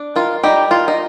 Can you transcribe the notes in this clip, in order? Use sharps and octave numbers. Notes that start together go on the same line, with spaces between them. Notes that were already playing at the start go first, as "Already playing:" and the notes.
Already playing: D4
D#3 F4
G3 D#4 G4
D#3 F4
D#4